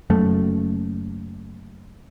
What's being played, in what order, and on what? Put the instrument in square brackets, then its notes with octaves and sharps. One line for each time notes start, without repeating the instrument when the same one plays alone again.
[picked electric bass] F#1 F#2 A3